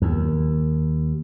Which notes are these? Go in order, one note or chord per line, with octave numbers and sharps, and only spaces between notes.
D#2